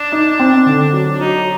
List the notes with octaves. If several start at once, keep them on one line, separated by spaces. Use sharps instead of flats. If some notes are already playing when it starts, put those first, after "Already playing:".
Already playing: D4
D#4
C4
D3
F#3
F#3 D#4